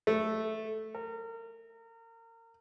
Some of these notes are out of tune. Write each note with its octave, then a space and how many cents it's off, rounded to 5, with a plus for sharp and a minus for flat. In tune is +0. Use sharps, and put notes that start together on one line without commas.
A3 -5
A#4 -30